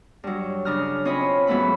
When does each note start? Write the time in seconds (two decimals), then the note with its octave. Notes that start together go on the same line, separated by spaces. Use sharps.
0.24 G2 F#3
0.65 C#3 D4 A#5 D#6 F6
1.05 C4 C#4 F4 C#5 D#5 B5
1.47 G#2 F#3 A3 B3 E4 B5